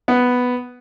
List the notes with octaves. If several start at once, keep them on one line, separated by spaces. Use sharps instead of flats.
B3